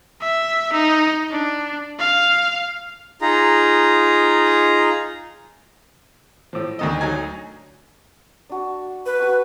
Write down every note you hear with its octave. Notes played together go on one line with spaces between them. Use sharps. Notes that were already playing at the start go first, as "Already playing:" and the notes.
E5
D#4
D4
F5
D#4 F4 G#4 A#5
A2 F3
D2 D#3 D#5
D2 F#3 D#4 G#5
D4 F#4
B4
F#4 A5 C#6